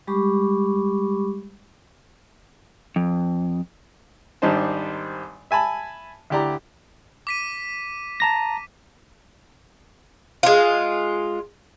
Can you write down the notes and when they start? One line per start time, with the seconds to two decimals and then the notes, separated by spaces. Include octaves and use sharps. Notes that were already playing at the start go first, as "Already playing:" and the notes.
0.07 G3 G#3 G4 B5 C#6 D6
2.96 F2
4.42 G#1 G3 D4 D#4 C5 A5
5.51 E5 G#5 A5 B5
6.30 D2 E4 G4 D5 A#5
7.27 D6 B6 D#7
8.20 A5 A#5 A#6
10.43 G#3 F4